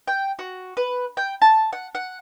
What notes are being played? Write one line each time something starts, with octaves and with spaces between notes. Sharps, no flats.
G5
F#4
B4
G5
A5
F#5
F#5